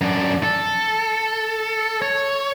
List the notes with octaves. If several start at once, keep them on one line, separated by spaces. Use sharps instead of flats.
F#2 D4
A4
C#5